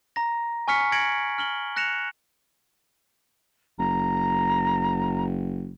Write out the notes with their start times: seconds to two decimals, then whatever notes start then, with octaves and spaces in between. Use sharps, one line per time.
0.16 A#5 A#6
0.68 G#5 C#6 F6 B6 C#7
0.92 G#6 A#6 C#7 D7 F#7
1.38 F6 F#7 G7
1.76 F#6 A#6 C#7 E7 F7
3.79 F#1 A#5